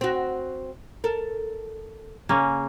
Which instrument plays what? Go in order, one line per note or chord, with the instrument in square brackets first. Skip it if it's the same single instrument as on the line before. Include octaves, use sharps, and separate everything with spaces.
[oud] C4 F#4
A4 A#4
[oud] C#3 [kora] A#3 C#4